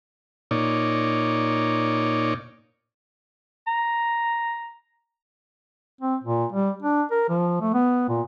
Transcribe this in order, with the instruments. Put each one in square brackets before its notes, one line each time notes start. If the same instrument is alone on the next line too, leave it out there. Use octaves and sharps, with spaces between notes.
[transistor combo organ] A#2 D#4 C#5 D5
[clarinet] A#5
[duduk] C4
A#2
G3
D4
A#4
F3
A3
B3
A#2